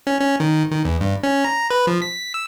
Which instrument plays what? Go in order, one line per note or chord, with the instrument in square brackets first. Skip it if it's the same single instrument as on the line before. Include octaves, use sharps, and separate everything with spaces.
[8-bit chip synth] C#4
C#4
D#3
D#3
E2
G2
C#4
A#5
B4
F3
B6
E6